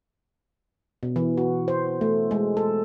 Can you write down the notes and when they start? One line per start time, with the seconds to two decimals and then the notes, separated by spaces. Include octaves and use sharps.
1.03 B2
1.16 E3
1.37 F#4
1.68 C5
2.01 A3
2.31 G#3
2.57 A4